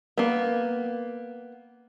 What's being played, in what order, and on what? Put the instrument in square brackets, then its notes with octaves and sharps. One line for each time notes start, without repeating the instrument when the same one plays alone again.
[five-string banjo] A#3 B3